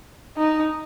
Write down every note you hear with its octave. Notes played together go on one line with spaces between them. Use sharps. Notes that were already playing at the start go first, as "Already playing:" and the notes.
D#4